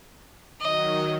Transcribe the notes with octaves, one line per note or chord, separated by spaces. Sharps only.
D#3 F#3 D#5